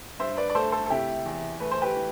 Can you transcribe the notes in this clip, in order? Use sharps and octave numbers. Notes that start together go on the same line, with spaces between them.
G2 C5 E5
B4 D5
D5
A3 A4 C5
A4 C5
A4
C3 E4 G4
E2
A3 B4
C5
G4 B4
E3